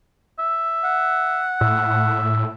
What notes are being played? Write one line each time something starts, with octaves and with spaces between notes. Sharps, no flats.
E5
F#5
A2 E5